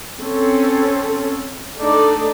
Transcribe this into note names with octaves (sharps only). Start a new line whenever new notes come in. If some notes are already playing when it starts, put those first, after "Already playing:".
C4 C#4 A4
A3 D4 D#4 A4 D5